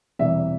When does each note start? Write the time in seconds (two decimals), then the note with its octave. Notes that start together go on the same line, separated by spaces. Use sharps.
0.19 E1 E2 C3 E3 G3 E5